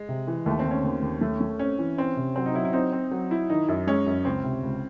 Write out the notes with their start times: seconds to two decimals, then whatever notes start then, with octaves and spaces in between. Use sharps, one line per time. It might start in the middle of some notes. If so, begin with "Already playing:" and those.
Already playing: G#3
0.09 C3
0.27 E3
0.46 D#2 A3
0.59 C4
0.65 D#2
0.71 C#4
0.84 D#2
1.02 D#2
1.21 A3
1.41 A3
1.59 C4 C#4
1.79 E3
1.97 C4 C#4
2.17 C3
2.36 F#3 C4
2.46 D#4
2.54 F#3 E4
2.65 E4
2.73 C4 D#4
2.92 C4
3.11 F#3
3.31 E4
3.49 D#3 D#4
3.69 F#2
3.87 G#3 C#4
4.07 F#2
4.25 C#2 C4
4.44 C3
4.63 C#2